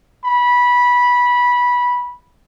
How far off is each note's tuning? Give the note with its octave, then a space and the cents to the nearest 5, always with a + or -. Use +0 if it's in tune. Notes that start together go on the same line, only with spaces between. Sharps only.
B5 -15